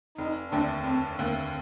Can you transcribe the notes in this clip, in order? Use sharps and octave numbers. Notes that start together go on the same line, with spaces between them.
F1 D#4
D#2 D3 A3 C4 D4
F1 C4
D#2 D3 A3 A#3 C4